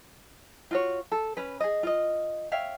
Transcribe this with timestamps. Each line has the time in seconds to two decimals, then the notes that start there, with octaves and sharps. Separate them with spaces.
0.71 F4 F#4 C#5
1.12 A4
1.37 C#4 B4
1.60 G#4 D#5
1.83 F4 D#5
2.52 C#5 E5 F5 G5